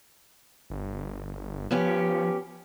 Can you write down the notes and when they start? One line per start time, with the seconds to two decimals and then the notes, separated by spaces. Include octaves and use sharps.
0.70 G1
1.71 F3 B3 C#4 G4